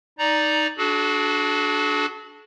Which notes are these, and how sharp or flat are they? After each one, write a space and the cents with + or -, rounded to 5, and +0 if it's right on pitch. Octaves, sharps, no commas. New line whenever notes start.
D#4 +0 D5 +0 A#5 +0
D4 -5 F#4 +0 A4 -45